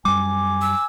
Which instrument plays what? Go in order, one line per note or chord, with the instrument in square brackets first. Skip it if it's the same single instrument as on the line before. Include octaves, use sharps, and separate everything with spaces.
[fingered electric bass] F#2 G3 [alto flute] G#5 [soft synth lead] D6
[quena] E6